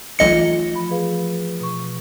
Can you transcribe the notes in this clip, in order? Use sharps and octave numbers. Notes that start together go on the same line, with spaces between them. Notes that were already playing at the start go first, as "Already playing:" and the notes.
B1 E3 A3 F4 D#5 C#7
F3 B5
G#4 B4 F5
B2 C#6